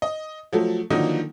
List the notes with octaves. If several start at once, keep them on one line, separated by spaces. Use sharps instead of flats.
D#5
F3 F#3 A3
D3 D#3 F3 F#3 A#3 D#4